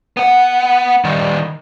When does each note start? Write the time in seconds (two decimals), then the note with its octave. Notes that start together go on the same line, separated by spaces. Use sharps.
0.17 B3 F#5
1.05 D#3 G3